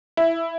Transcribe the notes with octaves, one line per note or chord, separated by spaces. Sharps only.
E4